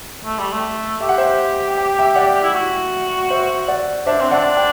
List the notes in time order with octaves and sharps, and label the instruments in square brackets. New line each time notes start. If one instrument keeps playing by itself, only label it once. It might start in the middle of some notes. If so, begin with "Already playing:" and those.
[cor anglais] A3
G3
A3
[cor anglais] G4 [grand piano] E5
[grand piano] F#5
C5 E5
G5
E5 G5
D5 F#5
[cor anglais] E4
F#4
[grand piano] C5 E5
D5 F#5
[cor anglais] D4 [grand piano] C5 E5
[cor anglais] C4
[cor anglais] D4 [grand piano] D5 F#5
[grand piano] G5